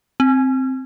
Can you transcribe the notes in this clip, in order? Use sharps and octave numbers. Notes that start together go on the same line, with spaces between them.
C4